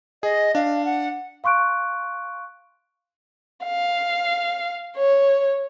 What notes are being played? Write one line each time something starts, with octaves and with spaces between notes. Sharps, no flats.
G#4 D#5
D4 F5
F#5
F5 C6 C#6 F#6 D7
F5
C#5